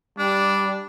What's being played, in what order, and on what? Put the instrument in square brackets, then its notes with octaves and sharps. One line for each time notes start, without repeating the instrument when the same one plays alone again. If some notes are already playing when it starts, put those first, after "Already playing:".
[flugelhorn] G3 [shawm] D4